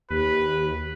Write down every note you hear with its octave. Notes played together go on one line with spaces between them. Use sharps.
D#2 G4 B4